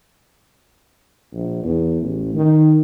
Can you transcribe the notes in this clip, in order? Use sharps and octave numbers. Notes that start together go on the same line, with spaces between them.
A#1
E2
A1
D#3